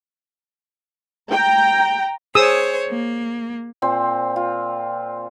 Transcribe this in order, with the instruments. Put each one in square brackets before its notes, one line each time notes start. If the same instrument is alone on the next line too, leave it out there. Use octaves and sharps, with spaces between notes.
[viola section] G5 A#5
[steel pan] G#4 D#6 E6 [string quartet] C5 C#5
[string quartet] A#3
[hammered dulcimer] A#2 C4 C5
F4